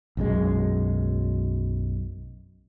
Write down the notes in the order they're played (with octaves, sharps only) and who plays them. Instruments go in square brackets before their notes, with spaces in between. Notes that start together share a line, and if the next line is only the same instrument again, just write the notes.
[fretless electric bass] B1 F#2 G#3